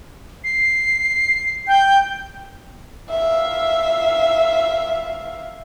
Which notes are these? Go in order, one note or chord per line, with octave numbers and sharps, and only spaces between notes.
C7
G5 G6
E5 F5